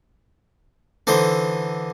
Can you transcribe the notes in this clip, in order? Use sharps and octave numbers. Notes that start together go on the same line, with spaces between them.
D3 E3 D#4 C5